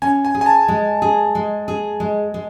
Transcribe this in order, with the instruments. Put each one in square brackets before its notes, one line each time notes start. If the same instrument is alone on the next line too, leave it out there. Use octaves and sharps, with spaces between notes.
[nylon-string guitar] C#4 [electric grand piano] G#5
[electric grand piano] G#5
[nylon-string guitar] G#4
[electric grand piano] G#5
A5
[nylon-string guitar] G#3
G#4
G#3
G#4
G#3
G#3